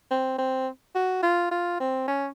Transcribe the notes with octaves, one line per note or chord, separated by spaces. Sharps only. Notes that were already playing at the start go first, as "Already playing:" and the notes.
C4
C4
F#4
F4
F4
C4
C#4